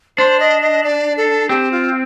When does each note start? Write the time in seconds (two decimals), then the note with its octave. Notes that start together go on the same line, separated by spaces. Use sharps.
0.18 D4 C5
0.40 D#5
0.62 D#5
0.84 D5
1.17 A4
1.49 C4 G4
1.72 F4